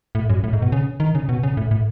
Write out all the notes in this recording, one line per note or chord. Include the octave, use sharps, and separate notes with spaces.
A2
F#2
A2
G#2
B2
C#3
D#3
C#3
B2
C#3
A2
A2